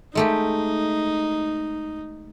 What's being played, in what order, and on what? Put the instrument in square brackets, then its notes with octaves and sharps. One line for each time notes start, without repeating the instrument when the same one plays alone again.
[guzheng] G#3 A3 G4 [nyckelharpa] D#4